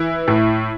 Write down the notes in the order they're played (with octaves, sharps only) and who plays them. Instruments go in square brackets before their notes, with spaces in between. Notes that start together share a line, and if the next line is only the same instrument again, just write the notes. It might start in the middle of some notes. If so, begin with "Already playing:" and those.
Already playing: [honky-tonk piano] E3 E4
A2